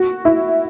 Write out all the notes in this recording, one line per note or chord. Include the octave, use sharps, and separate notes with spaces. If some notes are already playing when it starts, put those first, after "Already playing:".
Already playing: F#4
E4